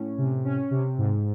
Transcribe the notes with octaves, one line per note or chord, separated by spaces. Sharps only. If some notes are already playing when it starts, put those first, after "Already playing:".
Already playing: A2 C#4
C3
C#4
C3
G#2